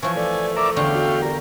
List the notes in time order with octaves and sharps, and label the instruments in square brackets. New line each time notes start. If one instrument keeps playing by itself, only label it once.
[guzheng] E3 F3 [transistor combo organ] G#5 [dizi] C#6
[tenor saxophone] A3 [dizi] D5
[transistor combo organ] A#4 D5 E5 [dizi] D6
[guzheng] E2 D3 F4 [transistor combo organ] F5 G5 [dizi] C#6
[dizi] F#4
[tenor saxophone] G3 [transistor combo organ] A#4